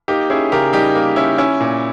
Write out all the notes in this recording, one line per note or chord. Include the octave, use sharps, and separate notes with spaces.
A#3 D#4 G4
C#4 E4 G#4
C#3 G4 A#4
G3 D#4 G4
A#3
C#4 E4
C#4 E4
A#2